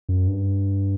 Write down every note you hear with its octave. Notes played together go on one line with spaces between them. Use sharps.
F#2
G2